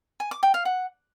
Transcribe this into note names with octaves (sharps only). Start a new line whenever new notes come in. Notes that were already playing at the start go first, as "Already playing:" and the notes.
G#5
D6
G5
F5
F#5